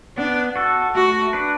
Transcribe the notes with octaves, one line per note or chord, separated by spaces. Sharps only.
B3 D4
F#4 A4
A3 F#4
D4 B4